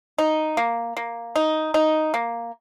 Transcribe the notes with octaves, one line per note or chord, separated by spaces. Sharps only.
D#4
A#3
A#3
D#4
D#4
A#3